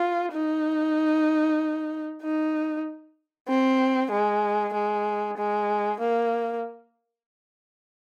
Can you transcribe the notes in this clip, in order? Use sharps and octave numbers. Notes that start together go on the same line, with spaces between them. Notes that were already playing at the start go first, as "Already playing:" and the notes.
Already playing: F4
D#4
D#4
C4
G#3
G#3
G#3
A#3